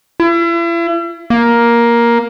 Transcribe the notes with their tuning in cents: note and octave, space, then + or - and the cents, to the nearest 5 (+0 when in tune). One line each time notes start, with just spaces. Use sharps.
E4 +40
A#3 +10